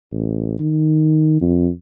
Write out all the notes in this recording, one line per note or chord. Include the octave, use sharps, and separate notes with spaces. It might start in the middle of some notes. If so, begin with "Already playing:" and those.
A1
D#3
F2